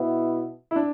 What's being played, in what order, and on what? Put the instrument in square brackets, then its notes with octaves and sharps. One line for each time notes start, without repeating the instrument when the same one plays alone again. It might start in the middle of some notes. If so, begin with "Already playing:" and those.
Already playing: [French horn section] B2 B3 E4
[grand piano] E4
D4